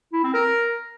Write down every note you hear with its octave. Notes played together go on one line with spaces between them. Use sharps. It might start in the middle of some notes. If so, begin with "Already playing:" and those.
E4
C4
A#4